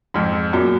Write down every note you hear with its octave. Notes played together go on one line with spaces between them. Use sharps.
F2 G#2
F#2 A#2